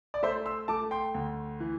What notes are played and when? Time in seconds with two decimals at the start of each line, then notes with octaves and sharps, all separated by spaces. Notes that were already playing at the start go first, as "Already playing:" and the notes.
0.14 D5
0.23 A3 C5 E5
0.46 C6 E6
0.68 A3 A5 D6
0.91 G5 C6
1.15 D2
1.60 E3